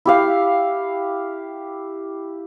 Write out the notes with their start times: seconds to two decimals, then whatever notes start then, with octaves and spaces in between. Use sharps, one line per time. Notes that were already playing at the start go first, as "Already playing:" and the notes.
0.05 E4 G4 F5